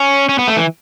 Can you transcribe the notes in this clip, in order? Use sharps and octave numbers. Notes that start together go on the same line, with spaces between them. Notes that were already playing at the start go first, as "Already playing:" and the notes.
Already playing: C#4
C#4
B3
A3
E3